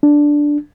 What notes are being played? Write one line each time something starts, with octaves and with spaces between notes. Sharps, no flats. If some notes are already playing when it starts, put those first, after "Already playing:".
D4